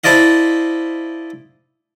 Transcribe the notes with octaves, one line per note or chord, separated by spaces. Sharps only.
E4 A4 C5 D5 D#5 F5